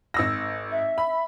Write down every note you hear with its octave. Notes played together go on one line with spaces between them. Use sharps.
G#1 E6 A#6
E5
B5